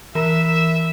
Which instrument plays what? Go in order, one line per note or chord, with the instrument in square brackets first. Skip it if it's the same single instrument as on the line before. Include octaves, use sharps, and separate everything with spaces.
[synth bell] E3 [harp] A#4 [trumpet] E5 [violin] E7